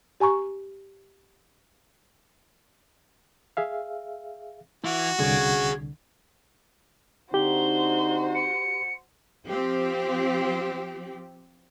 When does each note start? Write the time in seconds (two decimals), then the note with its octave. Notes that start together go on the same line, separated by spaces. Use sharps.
0.20 G4 G#5 A#5 C#6
3.57 G#4 E5 F5
4.84 E3 E4 F#4
5.20 C2 D3 G#4 C#5
7.34 D3 C4 D#4 F#4 G4 C5 G7
8.35 C#7
9.46 F3 C4 G4